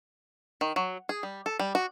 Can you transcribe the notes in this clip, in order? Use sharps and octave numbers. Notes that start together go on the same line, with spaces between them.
D#3
F#3
G#4
G3
A4
G3
F#4